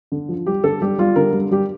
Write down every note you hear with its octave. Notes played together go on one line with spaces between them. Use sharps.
D3
F3
G3 G4
D3 A4
G3 G4
G3 F4
D3 A#4
G3
G3 G4